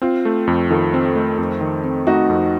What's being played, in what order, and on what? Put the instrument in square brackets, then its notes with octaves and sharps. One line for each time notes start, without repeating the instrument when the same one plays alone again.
[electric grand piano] C4 [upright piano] F4
[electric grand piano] A3
F2
[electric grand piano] D#3 [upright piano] F4 A4
[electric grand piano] C4
A3
F2
D#3
C4
[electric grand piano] A3 [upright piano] D#4 F#4
[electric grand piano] F2